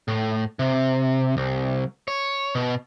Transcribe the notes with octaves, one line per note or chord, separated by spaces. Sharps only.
A2
C3
C2
C#5
B2